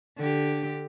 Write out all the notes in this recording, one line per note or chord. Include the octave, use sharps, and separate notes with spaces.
D3 G4